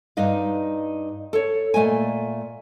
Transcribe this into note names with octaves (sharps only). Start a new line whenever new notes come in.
G2 D#4 D#5 F5
A4 C#5
A#2 A3 D#5 G#5